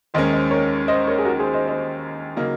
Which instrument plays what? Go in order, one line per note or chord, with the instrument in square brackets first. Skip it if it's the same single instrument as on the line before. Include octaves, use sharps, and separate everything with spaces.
[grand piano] D#2 D#3 G#3 C#4 [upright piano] C5 D#5
[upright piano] C5 D#5
A#4 C#5
C5 D#5
A#4 C#5
G#4
F#4 A#4
G#4 C5
C5 D#5
C5 D#5
[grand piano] C#3 F#3 A#3 D#4